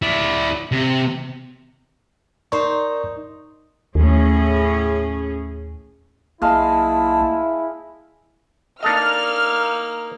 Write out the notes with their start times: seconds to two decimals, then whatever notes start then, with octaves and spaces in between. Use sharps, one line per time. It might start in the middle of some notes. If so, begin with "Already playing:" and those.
0.02 E4 D5
0.72 C3
2.52 D#4 A#4 C5 D5 C#6
3.95 D#2 A2 C#4 G#4
6.42 B1 G#3 A#3 E4 F5 A5 C6
8.83 A#3 D4 D#4 A4 D#5 F6